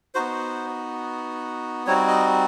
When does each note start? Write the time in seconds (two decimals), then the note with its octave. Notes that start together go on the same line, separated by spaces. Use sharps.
0.15 B3 D#4 F#4 C5
1.87 G3 C4 D#4 F#4 C#5
2.07 D#5